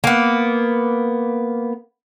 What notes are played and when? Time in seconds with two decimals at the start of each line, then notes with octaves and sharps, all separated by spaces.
0.04 A#3 B3